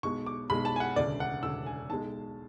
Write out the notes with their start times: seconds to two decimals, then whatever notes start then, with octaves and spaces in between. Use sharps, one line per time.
0.03 B1 B2 G#3 C#6
0.26 D6
0.50 B1 B2 G#3 B5
0.65 A5
0.76 G#5
0.80 F#5
0.96 E1 D2 C#3 D5
1.20 F#5
1.43 E1 D2 C#3 E6
1.66 G#5
1.90 B1 B2 G#3 A5